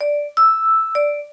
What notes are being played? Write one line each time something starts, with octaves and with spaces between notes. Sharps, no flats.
D5
E6
D5